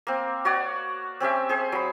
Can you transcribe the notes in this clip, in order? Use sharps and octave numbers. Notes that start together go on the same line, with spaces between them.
A#3 C4
F#4 C#5 D5 F#5
C4 C#4 G4 E5
G#4 C5
F#3 B5